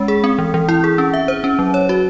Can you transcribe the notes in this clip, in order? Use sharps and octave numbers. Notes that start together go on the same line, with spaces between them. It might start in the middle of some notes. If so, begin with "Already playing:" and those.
Already playing: G#3 C#4
G#4
C4
E3
E3
E4
G#4
C#4
E5
C5
C#4
F#3
C#5
F#4